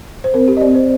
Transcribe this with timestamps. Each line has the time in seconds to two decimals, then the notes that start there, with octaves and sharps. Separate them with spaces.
0.24 C5
0.34 C4 A#4
0.48 G4
0.57 D#5
0.61 C4 D5
0.75 C5